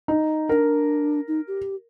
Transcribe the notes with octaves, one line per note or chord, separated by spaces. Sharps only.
D#4
D4 A#4
D#4
G4